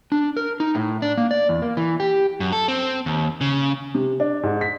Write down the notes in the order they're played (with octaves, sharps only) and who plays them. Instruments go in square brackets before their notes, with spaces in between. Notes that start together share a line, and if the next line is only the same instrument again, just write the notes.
[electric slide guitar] D4
A#4
D#4
A2
D4
A#3
D5
E2
A#3
E3
G4
[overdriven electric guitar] F#2
A4
C4
D#2
C#3
[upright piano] C3
D4
G#2
B6